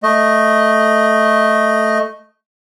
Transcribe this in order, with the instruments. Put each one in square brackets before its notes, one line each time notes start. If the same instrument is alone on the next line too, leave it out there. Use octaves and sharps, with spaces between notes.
[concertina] A3 D#5